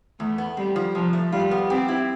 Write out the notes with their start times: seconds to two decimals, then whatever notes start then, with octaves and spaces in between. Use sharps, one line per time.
0.19 E2 A3
0.38 B3
0.57 G3 C4
0.76 F3
0.95 C3 F3
1.13 A3
1.32 G3 F4
1.51 B3
1.70 C4 G4
1.88 E4